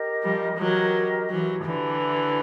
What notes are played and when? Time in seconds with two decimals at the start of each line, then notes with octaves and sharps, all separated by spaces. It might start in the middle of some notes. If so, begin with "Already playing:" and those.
Already playing: G4 A#4 D#5
0.22 F3 G3
0.57 E3 F#3 G4 A#4 D#5
1.29 E3 F#3 E4 G4 C5
1.64 D3 E3
2.01 E4 G4 C5